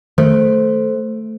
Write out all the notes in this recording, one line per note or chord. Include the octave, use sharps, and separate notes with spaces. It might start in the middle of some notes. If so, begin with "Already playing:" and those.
D#3 A3 C5